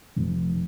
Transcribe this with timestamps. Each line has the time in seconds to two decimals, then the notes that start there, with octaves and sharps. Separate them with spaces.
0.16 F1